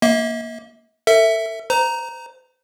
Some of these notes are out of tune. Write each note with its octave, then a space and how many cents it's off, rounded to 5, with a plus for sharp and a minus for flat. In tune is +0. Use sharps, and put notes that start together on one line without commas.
A#3 +5 E5 -45
A4 +40 E5 +0
C5 -35 A#5 +0